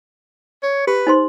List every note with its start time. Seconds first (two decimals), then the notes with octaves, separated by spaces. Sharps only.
0.63 C#5
0.87 G4 B4
1.07 D#4 C5 C6